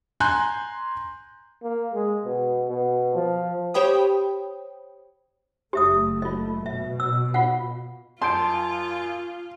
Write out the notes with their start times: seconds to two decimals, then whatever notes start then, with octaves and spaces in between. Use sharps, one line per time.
0.20 G#5 A#5 C6 F#6 G6
1.63 A#3
1.94 G#3
2.25 B2
2.68 B2
3.15 F3
3.74 G4 C5 C#5 G5 B5 D#6
5.73 F#1 A3 G4 E5 D#6
6.22 F4 D#5
6.66 B2 E5
7.00 E6
7.34 F4 F5 F#5
8.22 F#2 F4 A5 C6 G6 D7